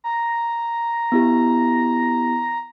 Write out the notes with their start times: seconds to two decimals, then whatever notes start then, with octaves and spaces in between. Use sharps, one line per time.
0.04 A#5
1.12 B3 E4 G4